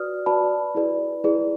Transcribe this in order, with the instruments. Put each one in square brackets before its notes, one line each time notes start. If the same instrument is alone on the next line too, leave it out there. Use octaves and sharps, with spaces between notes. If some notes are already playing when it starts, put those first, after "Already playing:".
Already playing: [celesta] F#4 B4 D5 D#6 F6
F#4 B4 D5 A5 B5
E4 G#4 B4 D5
E4 G#4 B4 D5